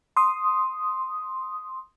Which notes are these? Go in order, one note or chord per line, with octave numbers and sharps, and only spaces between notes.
C6 D#6